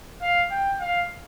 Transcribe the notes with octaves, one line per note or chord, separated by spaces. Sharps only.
F5
G5
F5